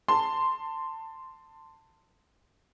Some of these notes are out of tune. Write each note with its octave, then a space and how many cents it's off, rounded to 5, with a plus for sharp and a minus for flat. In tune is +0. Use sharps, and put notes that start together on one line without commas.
A5 +20 C6 -5